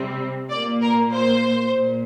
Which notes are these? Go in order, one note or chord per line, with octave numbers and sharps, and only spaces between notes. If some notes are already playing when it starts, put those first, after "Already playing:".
Already playing: C3 G3 C4
A#2 A#3 D5
A#4
C5
A#2